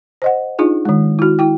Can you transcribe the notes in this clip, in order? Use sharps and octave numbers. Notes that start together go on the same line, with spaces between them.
C5 D#5 F#5
D4 D#4 F4 G#4
D#3 G#3
E4 F#4
E4 G5